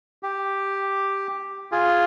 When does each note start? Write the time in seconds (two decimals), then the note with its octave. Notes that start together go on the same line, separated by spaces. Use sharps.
0.23 G4
1.72 F4 G#4